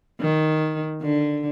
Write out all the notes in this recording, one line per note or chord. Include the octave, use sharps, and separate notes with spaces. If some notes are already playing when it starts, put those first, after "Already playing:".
D#3
D3